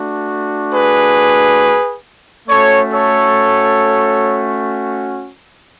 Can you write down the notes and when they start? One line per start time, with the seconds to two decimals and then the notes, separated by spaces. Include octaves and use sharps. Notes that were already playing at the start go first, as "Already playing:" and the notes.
Already playing: A3 D4 F#4
0.73 G#4 B4
2.49 A3 C#4 F#4 A4 C#5
2.92 A4 C#5